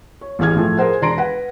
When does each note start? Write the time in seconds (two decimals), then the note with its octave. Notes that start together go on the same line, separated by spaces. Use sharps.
0.21 C#5
0.39 A1 E3 G#4 F6 G#6
0.56 A2 F3 A3
0.77 G#4 A#4 C5 F#5
1.01 E1 D4 A#5 C6 A#6 D7
1.18 B4 F#5